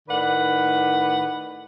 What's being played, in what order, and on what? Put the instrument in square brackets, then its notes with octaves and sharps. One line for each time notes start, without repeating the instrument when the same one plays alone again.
[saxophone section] A2 D#3 B4 D5 F#5